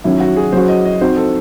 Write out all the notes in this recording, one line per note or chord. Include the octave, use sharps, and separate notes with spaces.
D#3 F#3 C#4 E4
F#4
G#4
F#3 C#4 F#4 C5
D#5
D#5
C4 D#4 F#4 C5
A4